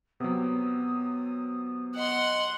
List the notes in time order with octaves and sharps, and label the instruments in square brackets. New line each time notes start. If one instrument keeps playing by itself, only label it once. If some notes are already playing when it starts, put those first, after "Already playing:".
[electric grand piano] C3 F#3 [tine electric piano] B3 [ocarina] D#6
[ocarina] D#5 [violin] F#5 C6